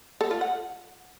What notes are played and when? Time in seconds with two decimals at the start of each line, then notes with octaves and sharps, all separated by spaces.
0.21 A4
0.31 F4
0.41 F#5